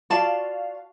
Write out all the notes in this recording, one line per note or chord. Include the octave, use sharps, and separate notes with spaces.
F4 F#4 D5 F5 A5